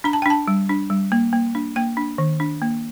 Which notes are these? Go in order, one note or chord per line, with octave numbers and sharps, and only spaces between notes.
D4 A#5
A5
G5
D4 A5
G3
D4
G3
A#3
A#3
D4
A#3 G5
D4
D#3
D4
A#3